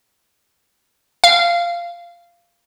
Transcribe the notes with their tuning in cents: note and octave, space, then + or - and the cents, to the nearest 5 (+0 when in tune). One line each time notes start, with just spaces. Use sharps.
F5 -15